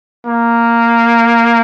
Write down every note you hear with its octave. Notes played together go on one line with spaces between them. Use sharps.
A#3